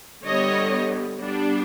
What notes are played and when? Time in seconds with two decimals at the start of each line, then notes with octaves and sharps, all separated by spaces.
0.24 D3 G3 B3 C#5 D#5
1.19 G3 B3 D4